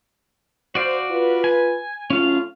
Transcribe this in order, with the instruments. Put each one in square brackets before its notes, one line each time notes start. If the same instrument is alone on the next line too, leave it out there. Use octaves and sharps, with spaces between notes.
[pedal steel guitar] F#4 D5 F5 [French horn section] C5
[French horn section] F4 B4
[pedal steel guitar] G#5
[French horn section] F#3 A3 F4 [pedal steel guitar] C#4 F5